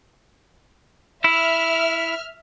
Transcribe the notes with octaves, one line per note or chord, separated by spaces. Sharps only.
E4 E5 F6